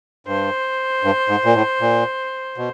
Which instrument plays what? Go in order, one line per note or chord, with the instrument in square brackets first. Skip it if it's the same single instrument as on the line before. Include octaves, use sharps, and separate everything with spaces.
[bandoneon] G2 [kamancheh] C5
[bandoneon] G2
G#2
A#2
A2
A#2
B2